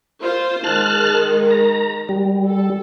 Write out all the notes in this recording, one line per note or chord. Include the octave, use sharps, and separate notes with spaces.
F4 C5
D#3 G#3 A5 F6 F#6
A#5
G3
A4